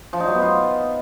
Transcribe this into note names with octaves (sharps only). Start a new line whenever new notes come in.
F3
D#4
F#3
B3
F4